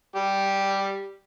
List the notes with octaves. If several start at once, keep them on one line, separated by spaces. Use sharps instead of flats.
G3 G4